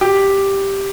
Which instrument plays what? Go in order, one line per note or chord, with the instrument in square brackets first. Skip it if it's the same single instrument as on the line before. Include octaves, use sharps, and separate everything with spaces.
[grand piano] G4